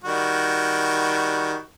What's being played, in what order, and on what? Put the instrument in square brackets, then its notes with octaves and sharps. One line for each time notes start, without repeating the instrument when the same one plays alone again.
[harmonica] D#3 G3 F#4